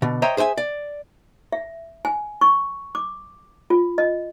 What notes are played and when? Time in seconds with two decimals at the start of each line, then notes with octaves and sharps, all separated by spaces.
0.02 B2 D3
0.22 C5 C#5 D#5 E5 G5 A#5
0.37 G#4 C5 E5 G5 G#5
0.58 D5
1.52 E5
2.05 G#5
2.41 C#6
2.95 D6
3.70 F4
3.98 D#5